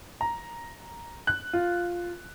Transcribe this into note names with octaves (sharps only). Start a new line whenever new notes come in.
A#5
F#6
F4